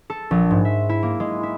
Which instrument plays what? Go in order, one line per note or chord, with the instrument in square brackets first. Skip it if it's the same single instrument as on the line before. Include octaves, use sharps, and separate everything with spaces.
[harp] A4
A#1
G#2
E5
E4
A#3
G#3
E4